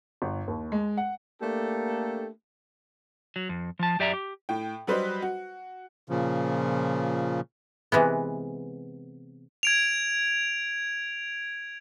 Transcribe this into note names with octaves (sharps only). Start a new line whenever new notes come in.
G1
D#2
G#3
F#5
A3 A#3 D4 G4 A4
F#3
F2
F3 A5
F#2 G4 D5 E5 G#5 A#5
G4
A2 G5
F#3 G3 B4 C5 D#5
F#4
A#2 C#3 F3
C3 E3 G#3 B3
G#6 D7 F7